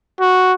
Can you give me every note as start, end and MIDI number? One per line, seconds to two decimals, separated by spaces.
0.20 0.53 66